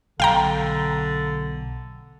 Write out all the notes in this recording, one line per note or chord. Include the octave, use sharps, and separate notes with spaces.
B1 D3 F5 G5 A#5